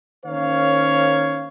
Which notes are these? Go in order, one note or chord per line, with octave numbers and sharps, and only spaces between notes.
D#3 A#3 C#4 C5 C#5 F5